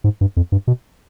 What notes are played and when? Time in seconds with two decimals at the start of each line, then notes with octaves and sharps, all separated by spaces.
0.04 G#2
0.21 G2
0.37 F2
0.52 G2
0.67 B2